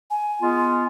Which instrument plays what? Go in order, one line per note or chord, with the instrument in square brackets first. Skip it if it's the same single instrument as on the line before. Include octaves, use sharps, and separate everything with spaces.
[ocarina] G#5
[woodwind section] G#3 B3 F4